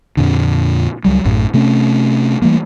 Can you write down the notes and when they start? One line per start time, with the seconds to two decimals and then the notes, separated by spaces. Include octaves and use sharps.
0.17 F2 A#2 D3
1.05 C#2 F#3 G3
1.25 A1 F#2 A2
1.54 C3 A3 C4 C#4
2.42 E3 G3 A3 A#3